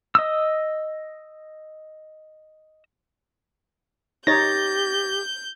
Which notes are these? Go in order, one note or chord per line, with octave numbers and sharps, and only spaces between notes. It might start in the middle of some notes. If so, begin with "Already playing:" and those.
D#5 D#6 E6
D#4 G4 C#5 G6 A6 A#6